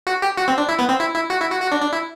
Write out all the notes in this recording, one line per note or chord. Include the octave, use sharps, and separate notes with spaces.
F#4
G4
F#4
C4
D4
E4
B3
C4
E4
E4
F#4
E4
F#4
F#4
D4
D4
E4